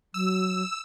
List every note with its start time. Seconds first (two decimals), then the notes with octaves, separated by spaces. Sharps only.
0.14 F#3 E6